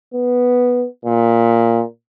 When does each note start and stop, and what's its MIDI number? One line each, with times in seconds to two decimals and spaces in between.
0.14 0.85 59
1.05 1.83 46